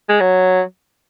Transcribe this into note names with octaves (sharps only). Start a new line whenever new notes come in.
G#3
F#3